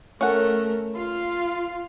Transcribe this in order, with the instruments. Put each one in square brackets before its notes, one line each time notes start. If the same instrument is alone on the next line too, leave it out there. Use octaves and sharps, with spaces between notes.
[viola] A3 A#4 [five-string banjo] C#4 F#5
[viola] F4 F5